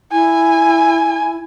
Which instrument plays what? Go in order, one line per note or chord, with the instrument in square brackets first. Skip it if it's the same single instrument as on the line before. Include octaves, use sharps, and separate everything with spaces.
[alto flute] E4 [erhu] G#5